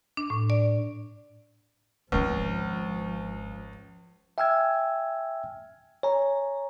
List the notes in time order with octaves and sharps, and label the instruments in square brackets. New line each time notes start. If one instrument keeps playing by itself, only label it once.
[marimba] D4
A2
D5
[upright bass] G#1 G#3 [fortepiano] C#2 [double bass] F3
[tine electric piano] E5 G5 G#5 E6 F6 G#6
C#5 G#5 A#5